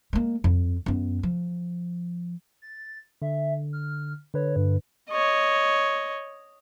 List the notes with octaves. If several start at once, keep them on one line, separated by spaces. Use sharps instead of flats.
G#3 A#3
F2
F#2 B3
F3
A6
D3 E5
F6
D3 B4 C#5
G2
C#5 D#5